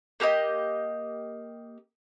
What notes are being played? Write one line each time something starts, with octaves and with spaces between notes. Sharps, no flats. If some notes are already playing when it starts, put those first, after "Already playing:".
A#3 G4 A#4 D#5